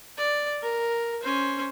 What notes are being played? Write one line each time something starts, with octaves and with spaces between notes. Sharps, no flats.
D5
A#4
C#4 C5